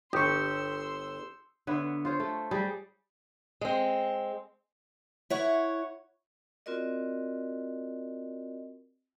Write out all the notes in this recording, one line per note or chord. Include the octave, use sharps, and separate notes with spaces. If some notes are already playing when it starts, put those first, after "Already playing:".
G1 G4 C6 C#6 D#6 E6 G6 C#7
D3 B3 C#5 E5
F4 C5 C#5
A3 A4
G3 G4 G#4
G#3 C4
E4 C#5 F#5
C4 F4 F#4 A#4 D5 D#5